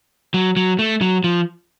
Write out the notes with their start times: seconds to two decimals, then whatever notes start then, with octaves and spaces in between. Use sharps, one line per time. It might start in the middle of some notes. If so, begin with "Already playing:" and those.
0.34 F#3
0.57 F#3
0.79 A3
1.01 F#3
1.24 F3